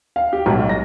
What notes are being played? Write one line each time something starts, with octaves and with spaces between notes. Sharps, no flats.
F5
G4
B1
A#6